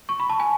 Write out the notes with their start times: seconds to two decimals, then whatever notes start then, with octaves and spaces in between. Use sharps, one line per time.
0.09 C#6
0.20 B5
0.30 A5
0.40 G#5